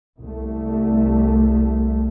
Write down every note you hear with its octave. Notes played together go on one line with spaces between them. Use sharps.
C2 A3